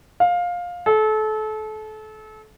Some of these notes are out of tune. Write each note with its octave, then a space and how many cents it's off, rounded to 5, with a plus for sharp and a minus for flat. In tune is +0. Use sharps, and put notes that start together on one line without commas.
F5 +15
A4 -30